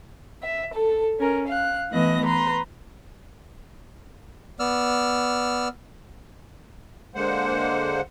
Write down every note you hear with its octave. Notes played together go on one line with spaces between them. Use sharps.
E5
A4
C#4 A#4
F5 F#6
E3 A3 B3 D#5 F#6 A#6
B4 A#5 C6
B3 D5 E6 F6
D3 G#3 A#3 C5 F#5